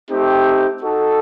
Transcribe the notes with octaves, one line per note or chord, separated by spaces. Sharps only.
A3 C4 D#4 G4
D#4 F#4 A4